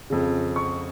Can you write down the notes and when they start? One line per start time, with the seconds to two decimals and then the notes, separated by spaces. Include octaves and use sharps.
0.10 F2 C#3
0.56 C#6